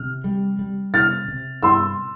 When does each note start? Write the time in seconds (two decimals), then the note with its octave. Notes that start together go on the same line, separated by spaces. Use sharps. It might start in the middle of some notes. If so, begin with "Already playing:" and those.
Already playing: C3 F6
0.24 G3
0.59 G3
0.94 C3 F6 A6
1.28 C3
1.63 G2 C6 E6